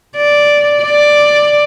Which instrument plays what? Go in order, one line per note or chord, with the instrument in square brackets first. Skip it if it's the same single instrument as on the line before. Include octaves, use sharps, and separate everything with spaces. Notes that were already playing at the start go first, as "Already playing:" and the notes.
[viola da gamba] D5
D5